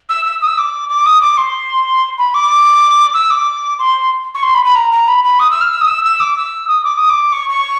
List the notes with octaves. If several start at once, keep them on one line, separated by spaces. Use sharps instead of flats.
E6
E6
D#6
E6
D6
D6
D#6
D6
C6
B5
D6
E6
D6
C6
C#6
C6
B5
B5
A#5
A#5
B5
B5
D#6
E6
F6
E6
D#6
E6
E6
D6
E6
D#6
D6
D#6
D6
C#6
C#6